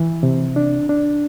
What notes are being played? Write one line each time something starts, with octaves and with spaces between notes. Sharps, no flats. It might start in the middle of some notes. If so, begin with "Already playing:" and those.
Already playing: E3
C3
D4
D4